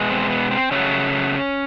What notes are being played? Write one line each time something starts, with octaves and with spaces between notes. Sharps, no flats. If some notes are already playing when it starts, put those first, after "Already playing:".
Already playing: B2 G#3
C4
B3
C4
C#3 F#3 A3 C#4